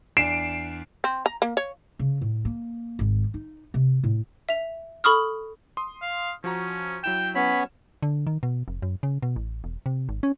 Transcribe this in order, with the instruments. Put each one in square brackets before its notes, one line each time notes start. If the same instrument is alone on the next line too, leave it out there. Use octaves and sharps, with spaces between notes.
[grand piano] E2 D4 B6 [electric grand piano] C7 D7 E7
[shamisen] C4
A#5
A#3
C#5
[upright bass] C#3
A2
A#3
G#1
D#4
C3
A2
[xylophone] E5 F7
A4 B5 C#6 D#6 F6
[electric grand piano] C6 D#6
[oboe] F5
[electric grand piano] F3 F#4 A#5 [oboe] C#4
[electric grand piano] F#3 E4 E7 [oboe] G5
[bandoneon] B3 C#4 C#5 [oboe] B5
[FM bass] D3
D#3
B2
F1
F#2
C#3
B2
A1
E1
C3
G#1
C#4